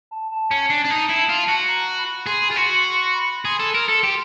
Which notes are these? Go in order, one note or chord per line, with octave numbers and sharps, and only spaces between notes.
A5
A5
C#4
D4
D4
D#4
E4
F4
F#4
A#5
B5
G#4 C6
F4
F#4 C6
C6
B5
G#4 C6
A4
A#4
A4
G4